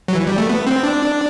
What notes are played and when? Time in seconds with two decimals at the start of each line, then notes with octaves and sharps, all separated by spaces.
0.08 F#3
0.15 E3
0.27 G3
0.38 A3
0.49 B3
0.67 C4
0.83 D4